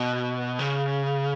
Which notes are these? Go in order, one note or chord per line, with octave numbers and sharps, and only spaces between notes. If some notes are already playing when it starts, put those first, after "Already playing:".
Already playing: B2
C#3